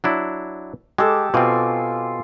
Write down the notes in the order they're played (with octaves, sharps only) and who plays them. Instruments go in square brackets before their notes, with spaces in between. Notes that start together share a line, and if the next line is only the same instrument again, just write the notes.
[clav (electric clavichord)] F#3 D4 E4
[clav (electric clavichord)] G#3 [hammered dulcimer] G4 A4
[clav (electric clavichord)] B2 C4 [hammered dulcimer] F4 G#5 D6